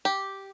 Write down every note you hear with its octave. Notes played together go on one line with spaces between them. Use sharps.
G4